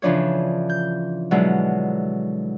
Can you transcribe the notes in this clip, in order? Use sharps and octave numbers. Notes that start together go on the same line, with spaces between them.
C#3 E3 F3 D4 C#5
G6
B2 D3 F#3 G#3 E4